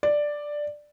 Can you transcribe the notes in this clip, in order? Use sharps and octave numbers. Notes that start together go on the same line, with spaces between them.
D5